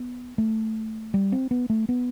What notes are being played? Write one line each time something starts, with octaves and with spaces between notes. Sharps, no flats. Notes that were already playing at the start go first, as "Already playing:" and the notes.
Already playing: B3
A3
G3
C4
B3
A3
B3